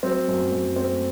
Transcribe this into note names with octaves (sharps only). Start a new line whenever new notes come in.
F#3 C4
F#2
F#2
A3 C4